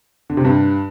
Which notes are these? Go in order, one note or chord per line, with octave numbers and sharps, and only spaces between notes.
D3
C3
G2